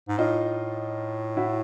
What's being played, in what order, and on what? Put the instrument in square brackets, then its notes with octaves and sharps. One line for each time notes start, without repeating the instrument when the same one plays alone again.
[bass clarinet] G#2
[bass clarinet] A2 [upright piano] D#4 F4
[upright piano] E4 F#4